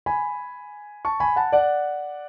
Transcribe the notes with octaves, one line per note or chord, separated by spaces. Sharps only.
G#5 B5
A5 C#6
G#5 B5
F#5 A5
D5 F#5